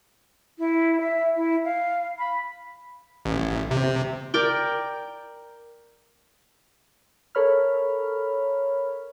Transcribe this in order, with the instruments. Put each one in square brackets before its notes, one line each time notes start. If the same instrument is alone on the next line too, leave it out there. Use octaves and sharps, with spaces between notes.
[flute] E4
E5
E4
F5
B5
[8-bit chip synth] A1
C3
[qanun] A#4 D5 G5
[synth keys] A4 A#4 C#5 B5 F6